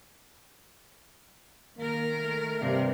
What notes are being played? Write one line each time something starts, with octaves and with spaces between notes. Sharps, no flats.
D#3 A#3 A#4
A3
G2 C3